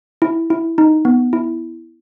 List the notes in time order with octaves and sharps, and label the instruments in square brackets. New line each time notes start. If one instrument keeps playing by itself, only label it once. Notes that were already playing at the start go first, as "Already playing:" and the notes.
[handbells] E4
E4
D#4
B3
E4